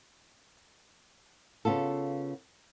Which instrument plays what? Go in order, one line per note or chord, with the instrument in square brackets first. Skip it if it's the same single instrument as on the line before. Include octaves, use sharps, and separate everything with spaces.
[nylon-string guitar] C#3 B3 F4 A4